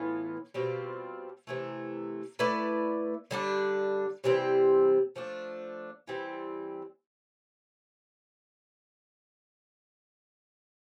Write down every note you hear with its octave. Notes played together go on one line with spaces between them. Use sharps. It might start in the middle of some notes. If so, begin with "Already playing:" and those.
Already playing: A2 E3 B3 F4
B2 G3 C4 F4
C3 E3 A3
A3 E4 B4 D5
D3 G3 D4
C3 E3 G3 C4
F3 A3 D4
E3 G3 C4